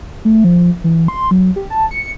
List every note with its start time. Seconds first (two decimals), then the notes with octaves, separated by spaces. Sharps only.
0.25 A3
0.44 F3
0.84 E3
1.08 C6
1.31 F#3
1.56 G4
1.70 A5
1.91 C#7